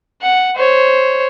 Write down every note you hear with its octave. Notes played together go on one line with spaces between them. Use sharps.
F#5
C5 C#5